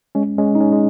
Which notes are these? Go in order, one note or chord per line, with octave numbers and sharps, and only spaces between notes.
G#3 C#4
G#3 C#4
D#4
G#3 C#4
G#3